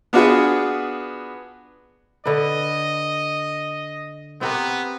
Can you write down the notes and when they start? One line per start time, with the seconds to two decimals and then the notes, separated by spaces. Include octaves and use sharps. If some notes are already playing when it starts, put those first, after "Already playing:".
0.13 B3 D4 F4 F#4 G#4 B4
2.26 D3 B4 D#5
4.41 B3 C4 G4 A#4